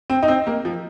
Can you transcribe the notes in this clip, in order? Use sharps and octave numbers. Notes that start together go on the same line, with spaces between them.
C4
D#4
C4
A#3
F3